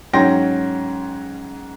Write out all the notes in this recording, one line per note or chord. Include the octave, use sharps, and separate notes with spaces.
G#2 F#3 C#4 G5 C6 A#6